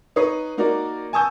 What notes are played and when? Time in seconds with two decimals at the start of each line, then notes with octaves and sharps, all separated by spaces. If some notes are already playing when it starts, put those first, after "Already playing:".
0.16 D#4 B4 C#5 D#6 C7
0.58 A#3 D#4 F#4 A#4 D5
1.13 G#5 A5 C#6 D#6 E6 G6